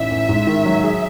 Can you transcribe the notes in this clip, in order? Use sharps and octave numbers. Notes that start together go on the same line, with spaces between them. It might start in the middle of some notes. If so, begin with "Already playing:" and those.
Already playing: A1 D#4 E5
A1
G#2
D#3
F#3
G#4